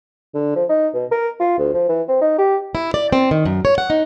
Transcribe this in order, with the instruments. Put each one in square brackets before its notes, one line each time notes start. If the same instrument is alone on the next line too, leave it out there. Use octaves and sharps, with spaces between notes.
[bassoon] D3
F3
D#4
B2
A#4
F4
D2
F3
E3
C4
D#4
G4
[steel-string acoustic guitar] E4
D5
C4
D#3
F#2
C#5
F#5
D#4